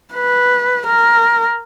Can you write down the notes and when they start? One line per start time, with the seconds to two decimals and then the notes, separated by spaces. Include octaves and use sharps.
0.15 B4
0.87 A#4